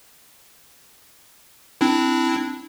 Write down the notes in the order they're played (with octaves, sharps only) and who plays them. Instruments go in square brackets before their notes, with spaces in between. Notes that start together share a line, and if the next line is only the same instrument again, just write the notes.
[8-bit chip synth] C4 D4 E4